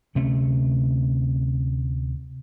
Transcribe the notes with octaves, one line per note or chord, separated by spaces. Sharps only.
D2 C3 A3 C#4